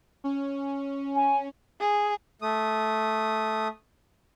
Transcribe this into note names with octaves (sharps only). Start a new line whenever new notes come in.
C#4
G#5
G#4
A3 D#6